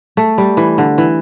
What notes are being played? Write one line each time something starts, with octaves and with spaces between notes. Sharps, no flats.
A3
G3
E3
D3
E3